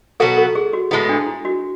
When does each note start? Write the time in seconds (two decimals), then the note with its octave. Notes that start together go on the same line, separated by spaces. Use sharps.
0.20 B2 F#3 B3 F#4 A4
0.37 A4
0.55 G#4
0.73 F#4
0.91 A2 G#3 B3 E4
1.09 D4
1.27 E4
1.45 F#4